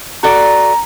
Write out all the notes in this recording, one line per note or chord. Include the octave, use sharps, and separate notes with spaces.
F#4 A4 D5 A#5